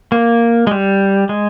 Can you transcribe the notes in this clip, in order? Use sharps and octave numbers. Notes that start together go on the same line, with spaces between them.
A#3
G#3
G3
G#3